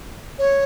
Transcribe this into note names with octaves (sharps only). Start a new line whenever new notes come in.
C#5